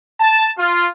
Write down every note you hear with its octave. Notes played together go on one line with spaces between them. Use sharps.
A5
F4